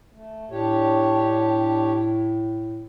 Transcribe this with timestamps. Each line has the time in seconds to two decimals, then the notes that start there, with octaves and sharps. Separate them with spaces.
0.13 A3
0.51 A2 D4 G4 C#5